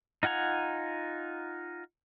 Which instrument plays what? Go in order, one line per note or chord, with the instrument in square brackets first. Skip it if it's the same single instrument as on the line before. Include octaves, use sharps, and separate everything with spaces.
[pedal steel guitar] D#4 F4 F#5 G#5 A#5